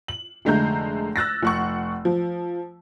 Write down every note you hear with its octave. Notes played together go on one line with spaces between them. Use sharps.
F#7
F1 D3 G#3 A3 A#5 G6
E6 F#6 A6 A#6
F1 F#5 C#6
F3